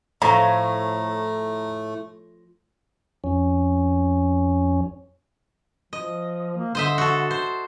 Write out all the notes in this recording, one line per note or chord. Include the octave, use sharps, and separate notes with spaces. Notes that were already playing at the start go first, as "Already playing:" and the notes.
A2 F3 A3 C#5 A#5
F2 C#4
F3 D#5
A#3
D3 C5 D#5 E5
F#4 A4
C5